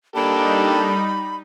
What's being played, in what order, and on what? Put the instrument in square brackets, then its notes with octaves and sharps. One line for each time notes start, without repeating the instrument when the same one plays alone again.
[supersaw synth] G3 D#4 [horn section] A#3 D4 [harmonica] G4 A4 [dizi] B5